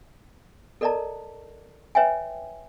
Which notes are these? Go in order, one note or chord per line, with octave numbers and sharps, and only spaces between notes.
A4 A#4 D5 D#5 A5 A#5
B4 C#5 E5 G5 G#5